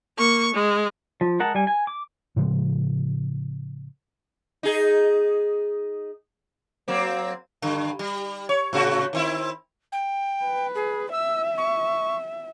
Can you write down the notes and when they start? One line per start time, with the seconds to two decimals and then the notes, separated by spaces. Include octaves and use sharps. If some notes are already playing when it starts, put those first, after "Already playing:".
0.18 A#3 C#6
0.54 G#3
1.21 F3
1.40 G#3 A#4 F#5 A5
1.55 G3 G#5
1.67 G#5
1.87 D6
2.36 A2 C#3 F3 G#3
4.63 D#4 G#4
6.88 F#3 A#3 C4
7.62 G2 D3
7.99 G3
8.49 C#5
8.73 A2 C#3 F#4
9.13 D#3 C4 E4
9.92 G5
10.44 B4
10.75 G#4
11.12 E5 E6
11.58 C#6